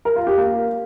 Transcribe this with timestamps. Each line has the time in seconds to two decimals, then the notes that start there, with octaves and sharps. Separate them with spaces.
0.05 A#4
0.16 F4
0.27 G4
0.37 A#3